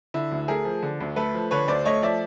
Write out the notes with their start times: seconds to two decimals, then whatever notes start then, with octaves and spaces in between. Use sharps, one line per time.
0.14 D3 E4
0.32 D2
0.48 A3 G#4 A#4
0.65 F3
0.82 D3
1.00 D2
1.16 A3 A4 B4
1.34 F3
1.51 D3 B4 C#5
1.68 D2 C5 D5
1.85 A3 C#5 D#5
2.02 F3 D5 E5